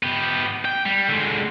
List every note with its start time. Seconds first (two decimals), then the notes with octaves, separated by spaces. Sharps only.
0.03 B3 G4
0.65 G5
0.85 G3
1.09 D3 G#3